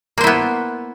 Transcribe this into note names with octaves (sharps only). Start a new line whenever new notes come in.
A#3 B3 E4 C5